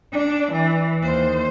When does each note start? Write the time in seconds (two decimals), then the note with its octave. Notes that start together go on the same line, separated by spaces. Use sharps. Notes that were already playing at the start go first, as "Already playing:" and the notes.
0.13 D4
0.52 E3
1.03 D#2 C5